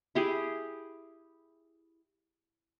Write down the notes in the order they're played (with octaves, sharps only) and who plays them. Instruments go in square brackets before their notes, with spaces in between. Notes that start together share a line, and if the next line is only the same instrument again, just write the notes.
[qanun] E4 G4 G#4